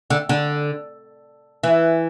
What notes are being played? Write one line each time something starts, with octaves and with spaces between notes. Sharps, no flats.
D3
D3
E3